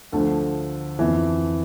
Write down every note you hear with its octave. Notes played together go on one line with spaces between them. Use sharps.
D2 D3 F3 A4
F2 E3